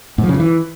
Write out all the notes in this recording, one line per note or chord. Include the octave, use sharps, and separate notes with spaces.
G#2
F3
C#3
G2
E3